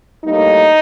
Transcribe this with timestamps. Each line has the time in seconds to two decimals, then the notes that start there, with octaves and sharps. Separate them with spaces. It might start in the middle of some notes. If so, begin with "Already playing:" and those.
0.25 A2 G3 A#3 D#4